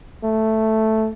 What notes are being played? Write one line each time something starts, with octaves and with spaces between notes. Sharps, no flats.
A3